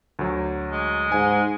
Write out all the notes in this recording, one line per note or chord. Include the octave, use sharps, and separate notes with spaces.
D2 F#3
G#3
G#2 G#5